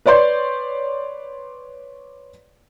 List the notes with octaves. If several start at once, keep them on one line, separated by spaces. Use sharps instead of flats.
B4 C#5 D5 C6 G6